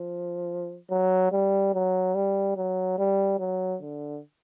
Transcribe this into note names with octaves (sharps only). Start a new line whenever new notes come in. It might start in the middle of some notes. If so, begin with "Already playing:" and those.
Already playing: F3
F#3
G3
F#3
G3
F#3
G3
F#3
D3